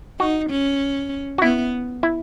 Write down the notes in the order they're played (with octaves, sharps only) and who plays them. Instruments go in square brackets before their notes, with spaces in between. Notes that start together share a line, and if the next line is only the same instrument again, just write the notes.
[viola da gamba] D#4 [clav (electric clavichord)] F#4
[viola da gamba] C#4
[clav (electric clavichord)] F#4
[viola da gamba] B3 [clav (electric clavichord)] E4
[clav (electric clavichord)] E4